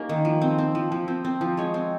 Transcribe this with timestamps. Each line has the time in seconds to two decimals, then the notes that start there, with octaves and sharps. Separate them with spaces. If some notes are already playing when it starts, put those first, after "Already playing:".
Already playing: A#3 C#4 D#4 G4
0.09 D#3
0.25 F3
0.41 C4
0.58 C4
0.75 F3
0.92 F3
1.08 C4
1.25 C4
1.41 F3
1.57 G#3 C#5
1.74 C4